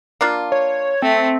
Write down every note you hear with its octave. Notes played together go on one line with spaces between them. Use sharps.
A#3 D4 F4
C#5
A3 C4